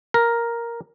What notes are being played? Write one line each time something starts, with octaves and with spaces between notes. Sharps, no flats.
A#4